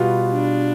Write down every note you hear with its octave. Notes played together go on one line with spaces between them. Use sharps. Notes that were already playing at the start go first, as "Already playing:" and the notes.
Already playing: B2 G3 B3 F4
D4